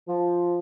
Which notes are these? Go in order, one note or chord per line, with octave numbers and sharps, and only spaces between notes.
F3